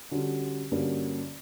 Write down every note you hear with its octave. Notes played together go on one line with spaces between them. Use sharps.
D3 G3 C#4 F#4
G2 D3 A#3 C#4 F#4